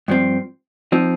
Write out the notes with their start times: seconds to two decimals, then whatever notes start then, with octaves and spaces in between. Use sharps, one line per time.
0.08 G2 F3 C4
0.92 F3 C4 D#4